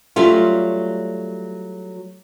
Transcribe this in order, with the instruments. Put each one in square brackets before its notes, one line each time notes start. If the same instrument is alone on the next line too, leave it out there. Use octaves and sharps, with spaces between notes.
[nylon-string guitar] F#3 G3 A3 C#4 F4